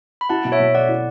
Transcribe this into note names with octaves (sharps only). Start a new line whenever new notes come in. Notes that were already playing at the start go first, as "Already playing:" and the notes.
B5
E4 F#5 A5
B2
C#5 E5
B2
A3 D5 F#5
E4